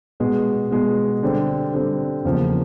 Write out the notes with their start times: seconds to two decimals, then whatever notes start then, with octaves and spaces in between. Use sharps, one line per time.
0.20 B2 G#3 B3
0.71 B2 G#3 B3
1.23 D3 G3 C4
1.73 D3 G3 C4
2.25 E2 C#3 F3 A#3